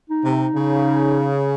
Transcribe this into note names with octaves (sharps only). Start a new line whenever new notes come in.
D#4
C3
C#3